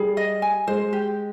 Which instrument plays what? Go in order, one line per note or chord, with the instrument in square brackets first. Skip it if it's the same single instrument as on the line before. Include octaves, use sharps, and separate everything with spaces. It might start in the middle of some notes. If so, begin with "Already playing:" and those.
Already playing: [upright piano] G3 [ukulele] G#4
[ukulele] D#5
G#5
[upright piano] G#3 [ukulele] C5
[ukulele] G4